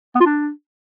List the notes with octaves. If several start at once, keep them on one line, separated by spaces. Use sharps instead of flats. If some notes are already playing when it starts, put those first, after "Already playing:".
B3
F4
D4